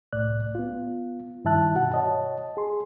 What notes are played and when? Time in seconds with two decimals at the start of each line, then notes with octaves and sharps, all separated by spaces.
0.13 C2 A2 D5 F#6
0.55 B3 F4
1.45 G2 D#3 E4 E5 A5 F#6
1.75 B2 F#4 F#5
1.92 C#5 D#5 A5
2.57 G#4 C6